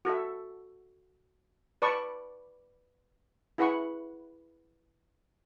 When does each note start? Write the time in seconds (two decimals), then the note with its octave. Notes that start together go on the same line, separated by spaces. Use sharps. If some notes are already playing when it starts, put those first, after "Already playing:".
0.05 F#4 A4 E5
1.82 B4 D5 A5 C#6
3.58 E4 G#4 B4 F#5 C#6